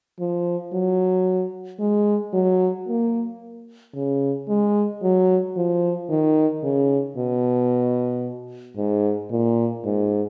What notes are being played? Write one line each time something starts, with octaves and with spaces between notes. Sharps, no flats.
F3
F#3
G#3
F#3
A#3
C#3
G#3
F#3
F3
D#3
C#3
B2
G#2
A#2
G#2